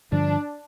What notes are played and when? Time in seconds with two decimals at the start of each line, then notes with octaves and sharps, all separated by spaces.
0.12 G2 D3 F3 D4